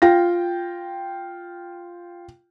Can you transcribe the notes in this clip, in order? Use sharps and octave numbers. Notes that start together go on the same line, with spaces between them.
F4 G5 A#6